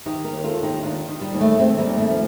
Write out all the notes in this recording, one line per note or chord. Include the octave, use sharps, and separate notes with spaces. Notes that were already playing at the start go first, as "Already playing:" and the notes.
D#3 D#4 G4
G4 A#4
D#2
F4 A4
D#2
D#4 G4
D#3 D4 F4
D#3
G3
D#2
A3
D#2 A3 C4
G3 A#3
D#2
A3
F3